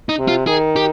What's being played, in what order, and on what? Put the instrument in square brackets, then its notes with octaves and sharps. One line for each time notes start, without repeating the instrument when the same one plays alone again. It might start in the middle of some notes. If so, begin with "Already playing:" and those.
[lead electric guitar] D#4
[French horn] C3
[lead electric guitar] F4
[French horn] D#3 [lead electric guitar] G#4
[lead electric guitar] G4